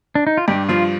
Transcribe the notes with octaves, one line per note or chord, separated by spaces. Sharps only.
D4
D#4
F4
G2 G4
F3 F4